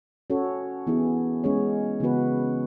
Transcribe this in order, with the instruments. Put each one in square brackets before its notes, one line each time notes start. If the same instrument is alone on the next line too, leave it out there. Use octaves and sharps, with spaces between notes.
[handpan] C#4 F#4 A4 C#5
E3 B3 E4 G#4
G#3 C#4 G#4 C#5
C#3 E3 B3 F#4 B4